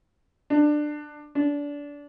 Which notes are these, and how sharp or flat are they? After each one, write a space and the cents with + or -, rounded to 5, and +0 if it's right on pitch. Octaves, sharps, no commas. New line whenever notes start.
D4 +20
D4 -25